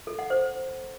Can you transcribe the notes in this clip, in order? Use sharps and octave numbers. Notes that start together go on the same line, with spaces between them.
A4
F#5
C5